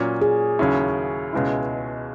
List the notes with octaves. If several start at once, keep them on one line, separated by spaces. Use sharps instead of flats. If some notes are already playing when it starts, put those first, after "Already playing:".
Already playing: A#2 F#3 C#4
G#4
D#2 C#3 F#3 C#4 E4
C#2 B2 G#3 C#4 E4